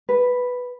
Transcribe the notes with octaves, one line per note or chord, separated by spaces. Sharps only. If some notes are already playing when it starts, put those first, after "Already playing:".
B4